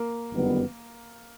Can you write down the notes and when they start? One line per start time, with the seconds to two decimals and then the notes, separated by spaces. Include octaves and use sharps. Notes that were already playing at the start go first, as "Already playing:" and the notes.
Already playing: A#3
0.31 G1 F#2 D#3 G3 B3